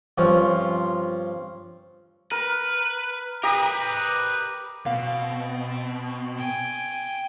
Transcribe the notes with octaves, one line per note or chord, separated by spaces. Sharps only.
G2 F3 C4 C#4 F4
A#4 B4
G4 A#4 B4 A#5 D#6
B2 C4 F5
G5 G#5